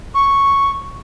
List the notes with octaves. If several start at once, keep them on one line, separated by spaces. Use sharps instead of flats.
C#6